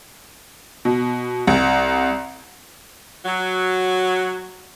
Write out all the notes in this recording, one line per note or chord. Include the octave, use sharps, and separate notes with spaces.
B2
C2
F#3